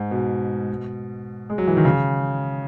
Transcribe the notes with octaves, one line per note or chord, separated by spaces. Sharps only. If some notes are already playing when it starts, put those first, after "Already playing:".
Already playing: G#2
B2
G#3
F#3
E3
D#3
C#3